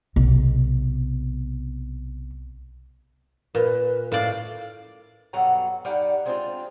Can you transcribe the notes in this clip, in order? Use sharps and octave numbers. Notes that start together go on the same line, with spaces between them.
B1 C3
A#2 B4
A2 D5 F5
G2 B2 F#3 F#4 A4 A#5
G2 G3 D#4 D5 F5 F#5
G#3 B3 C4 D4 D#4 F4